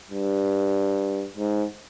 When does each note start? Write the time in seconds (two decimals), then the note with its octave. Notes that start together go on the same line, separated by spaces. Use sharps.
0.11 G2
1.37 G#2